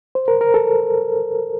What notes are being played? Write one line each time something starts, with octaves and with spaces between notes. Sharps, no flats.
C5
A#4
A#4
A4